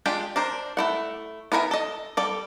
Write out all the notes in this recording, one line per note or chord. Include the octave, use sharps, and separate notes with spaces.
G#3 D4 F4 G4
D4 A#4 C5
A3 E4 F#5
B3 E4 A#4 C5 G#5
A4 D#5
G3 A4 D5